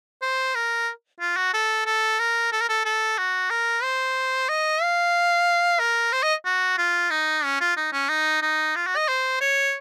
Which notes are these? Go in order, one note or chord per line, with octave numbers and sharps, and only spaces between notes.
C5
A#4
F4
F#4
A4
A4
A#4
A4
A#4
A4
A4
F#4
A#4
C5
D#5
F5
A#4
C5
D#5
F#4
F4
D#4
C#4
F4
D#4
C#4
D#4
D#4
F4
F#4
D#5
C5
C#5